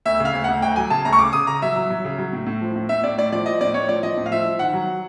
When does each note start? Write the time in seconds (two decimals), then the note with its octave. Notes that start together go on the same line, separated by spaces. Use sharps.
0.05 D2 E5
0.20 C#3
0.25 F5
0.34 D2
0.44 D2 F#5
0.62 D2 G5
0.76 F#3 G#5
0.90 C#3 A5
1.05 D2 A#5
1.13 C#6
1.19 C#3 D6
1.33 C#3 D#6
1.47 C#3 A#5
1.62 F#3 E5
1.76 F#3
1.90 F#3
2.05 C#3
2.18 F#3
2.33 A2
2.46 A2
2.62 F3
2.75 A2
2.89 A2 E5
3.04 A2 D5
3.18 A2 D5
3.32 F3 D5
3.46 F3 D#5
3.61 A2 D5
3.74 A2 C#5
3.89 F3 D5
4.03 F3 D#5
4.17 A2
4.26 F5
4.31 F3 E5
4.46 F3
4.59 D#3 F#5
4.74 F#3